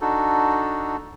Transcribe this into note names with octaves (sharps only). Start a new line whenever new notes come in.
D4 D#4 F#4 A4